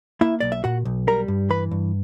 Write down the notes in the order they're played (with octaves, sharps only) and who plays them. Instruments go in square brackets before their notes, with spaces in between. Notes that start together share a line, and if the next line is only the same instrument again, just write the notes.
[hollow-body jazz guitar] A#3 E4 E5
B1 D5
E5
A#2 F#4 F#5
B1
G3 A#4 A#5
G2
E3 B4 B5
G2